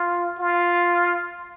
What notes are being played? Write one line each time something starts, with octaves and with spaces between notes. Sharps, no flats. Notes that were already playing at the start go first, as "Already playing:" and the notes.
Already playing: F4
F4